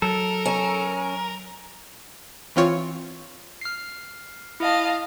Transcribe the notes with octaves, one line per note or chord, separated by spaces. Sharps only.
F#3 A4 A#4
C#4
E3 C4 F4 C#5
F6 C7
E4 D#5 F5 A5